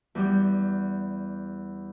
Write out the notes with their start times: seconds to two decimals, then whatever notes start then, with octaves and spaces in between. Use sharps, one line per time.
0.15 E2 G3